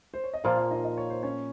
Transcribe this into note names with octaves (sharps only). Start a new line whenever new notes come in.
C5
C#5
D#5
A#2 F3 A#3 F4 F5
F4 F5
D#4 D#5
D#5
C#5
C5
C#4 C#5